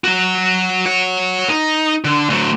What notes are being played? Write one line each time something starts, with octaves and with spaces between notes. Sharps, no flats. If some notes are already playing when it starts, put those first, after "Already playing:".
F#3 F#4
C#5 F#5
D#4
D3
D2 F#3